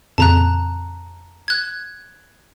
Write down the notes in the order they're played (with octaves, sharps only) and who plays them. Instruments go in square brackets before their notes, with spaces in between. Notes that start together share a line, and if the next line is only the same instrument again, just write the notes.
[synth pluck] F2 A#2 C#3 [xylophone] A5 A#5 F#6
[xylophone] F#6 G#6